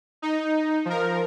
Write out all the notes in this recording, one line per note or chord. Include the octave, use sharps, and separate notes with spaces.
D#4
F3 A#4